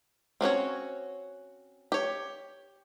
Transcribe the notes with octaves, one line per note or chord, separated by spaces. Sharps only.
C4 C#4 F#4 C#5
G4 C#5